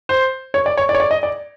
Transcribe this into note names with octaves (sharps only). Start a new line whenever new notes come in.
C5
C#5
D5
C#5
D5
C#5
D5
D#5
D5